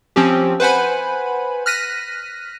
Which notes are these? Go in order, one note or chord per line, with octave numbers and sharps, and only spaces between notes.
F3 C4 C#4 G4
B4 C5 F#5 G#5 B5
F6 F#6 A#6 B6 D#7